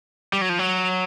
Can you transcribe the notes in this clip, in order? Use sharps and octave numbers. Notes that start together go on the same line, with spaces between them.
G3
F#3
F3
F#3